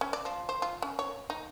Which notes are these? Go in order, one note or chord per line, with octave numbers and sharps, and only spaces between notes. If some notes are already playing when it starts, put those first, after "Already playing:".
C#4
D5
F3
C5
F4
C#4
C#5
D#4